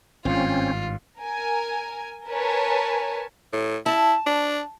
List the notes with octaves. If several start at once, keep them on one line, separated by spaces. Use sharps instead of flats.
G#1 G2 C4 C#4 F4
A#4 G#5
A#4 B4 C#5 G#5 A5
A2
E4 A5
D4